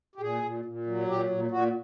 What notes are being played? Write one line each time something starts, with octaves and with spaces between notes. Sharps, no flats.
G4
A#2 G#4
A#2
A#2
F#3
A#2 G4
A#2
A#2 F#4